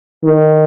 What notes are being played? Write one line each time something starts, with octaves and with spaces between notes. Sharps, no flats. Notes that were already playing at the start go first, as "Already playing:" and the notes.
D#3